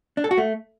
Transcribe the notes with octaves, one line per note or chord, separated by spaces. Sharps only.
D4
A4
F#4
A3